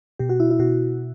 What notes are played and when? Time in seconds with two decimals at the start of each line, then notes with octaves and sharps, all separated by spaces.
0.19 B2 G4
0.29 F#4
0.40 E4
0.51 E4
0.59 B2 F#4